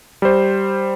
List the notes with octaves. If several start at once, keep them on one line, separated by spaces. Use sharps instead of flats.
G3 C5